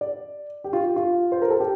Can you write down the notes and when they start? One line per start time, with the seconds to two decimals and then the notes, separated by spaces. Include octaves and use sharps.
0.01 D5
0.64 G4
0.73 F4
0.80 G4
0.96 F4
1.32 C5
1.42 A#4
1.50 A4
1.60 G4